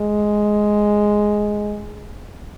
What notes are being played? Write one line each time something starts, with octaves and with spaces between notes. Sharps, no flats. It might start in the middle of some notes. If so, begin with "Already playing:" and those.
Already playing: G#3